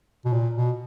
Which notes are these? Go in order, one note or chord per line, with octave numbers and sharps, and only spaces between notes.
B2
A#2
B2